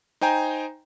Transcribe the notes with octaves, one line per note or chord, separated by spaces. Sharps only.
D#4 C5 G5 G#5 A#5